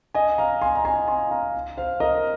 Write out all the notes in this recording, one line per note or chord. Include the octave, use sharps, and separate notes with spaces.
D#5 G#5
F5 A#5
G#5 C6
A#5
G#5 C6
G#5 C6
F5 A#5
C5 F5
A#4 D#5